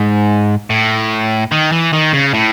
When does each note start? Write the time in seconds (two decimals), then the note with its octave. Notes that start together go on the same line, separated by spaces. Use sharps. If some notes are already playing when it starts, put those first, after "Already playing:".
Already playing: G#2
0.70 A2
1.52 D#3
1.72 E3
1.93 D#3
2.13 C#3
2.34 A2